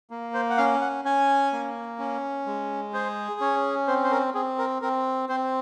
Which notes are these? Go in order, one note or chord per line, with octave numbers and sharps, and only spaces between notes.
A#3
C5
F#5
C#4 F5
F#5
C#4 G#5
A#3
C#4
G#3
G#4 C5
C#4 C#5
C4 C5
C5
A#4
C4 G#4
A#4
C4 A#4
C4 C5